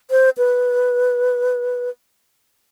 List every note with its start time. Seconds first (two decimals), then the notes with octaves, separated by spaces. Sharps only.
0.11 C5
0.38 B4